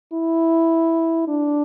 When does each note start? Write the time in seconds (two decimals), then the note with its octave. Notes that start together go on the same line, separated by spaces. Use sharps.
0.13 E4
1.28 D4